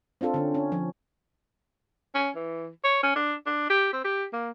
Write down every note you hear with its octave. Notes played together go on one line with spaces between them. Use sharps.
C4 D4 F4 A4
D3 C#4
C#4
F3
C#4
E3
C#5
C#4
D4
D4
G4
C4
G4
A#3